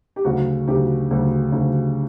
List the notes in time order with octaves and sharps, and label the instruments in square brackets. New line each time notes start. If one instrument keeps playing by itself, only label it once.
[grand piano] G4
D2 C#3 F#3 F#4
D2 C#3 F#3 G4
D2 C#3 F#3
D2 C#3 F#3